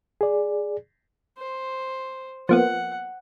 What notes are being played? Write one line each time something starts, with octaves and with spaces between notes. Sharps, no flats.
G#4 D5
C5
F3 A#3 B3 F#5